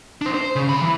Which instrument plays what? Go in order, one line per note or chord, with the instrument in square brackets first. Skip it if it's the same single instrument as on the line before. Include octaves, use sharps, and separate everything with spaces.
[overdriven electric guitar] D4 C5
C5
C#3
C3 B5
E3